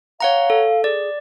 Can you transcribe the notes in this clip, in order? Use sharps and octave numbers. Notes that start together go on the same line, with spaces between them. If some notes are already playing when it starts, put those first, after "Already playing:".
C#5 F5 F#5 A#5
A4
G#4 D5